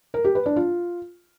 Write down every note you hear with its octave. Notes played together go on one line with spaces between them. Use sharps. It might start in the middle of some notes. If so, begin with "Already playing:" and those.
A#4
G4
B4
D4
F4